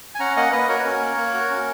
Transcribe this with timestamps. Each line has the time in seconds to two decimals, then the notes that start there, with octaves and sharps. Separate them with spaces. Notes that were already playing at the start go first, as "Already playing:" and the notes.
0.15 G#5
0.20 C#4 F#5 A#5
0.36 A#3 D#5 F#5
0.52 A#3 B4 D#5
0.69 F#4 A#4 C#5
0.86 C#4
1.01 A#3
1.17 A#3
1.34 F#4
1.50 C#4